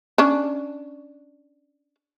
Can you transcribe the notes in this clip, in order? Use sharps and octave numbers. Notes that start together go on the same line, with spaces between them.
C#4 D4